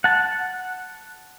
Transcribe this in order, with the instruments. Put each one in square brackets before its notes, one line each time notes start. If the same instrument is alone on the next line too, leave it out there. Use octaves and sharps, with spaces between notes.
[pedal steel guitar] F#5 A5